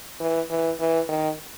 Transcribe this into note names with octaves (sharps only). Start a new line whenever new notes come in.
E3
E3
E3
D#3